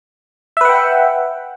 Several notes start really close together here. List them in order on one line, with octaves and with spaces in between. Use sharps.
E5 B4 F#5 G5